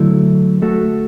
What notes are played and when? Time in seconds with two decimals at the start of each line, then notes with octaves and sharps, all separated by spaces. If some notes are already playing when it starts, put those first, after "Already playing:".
Already playing: D3 F#3 A3 E4
0.62 A3 F#4 A4